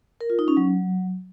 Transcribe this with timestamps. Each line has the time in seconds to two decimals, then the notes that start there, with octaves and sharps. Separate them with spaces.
0.21 A#4
0.30 F4
0.39 D#4
0.48 C#4
0.57 F#3